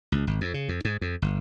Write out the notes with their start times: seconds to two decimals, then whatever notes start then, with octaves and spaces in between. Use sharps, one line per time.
0.12 C#2
0.27 G#1
0.41 F2
0.54 C#3
0.69 F2
0.85 G#2
1.01 F2
1.22 G1